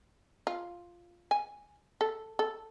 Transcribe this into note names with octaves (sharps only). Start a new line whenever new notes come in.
F4
G#5
A4
A4